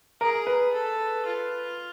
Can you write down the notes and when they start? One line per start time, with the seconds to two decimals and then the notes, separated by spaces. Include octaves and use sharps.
0.21 G#4 A#4
0.47 B4
0.73 A4
1.26 F4